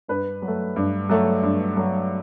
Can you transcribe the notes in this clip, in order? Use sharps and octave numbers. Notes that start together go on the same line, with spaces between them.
G2 B4
F#3
A3
G2
F#3 A3
G2
F#3 A3